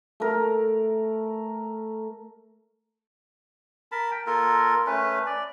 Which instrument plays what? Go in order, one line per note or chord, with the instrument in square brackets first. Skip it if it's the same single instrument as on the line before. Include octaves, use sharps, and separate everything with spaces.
[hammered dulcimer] A3 A#4
[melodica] A#4 A5 B5
G5
A#3 F4 A4 A#4
A3 C#4 B4
D5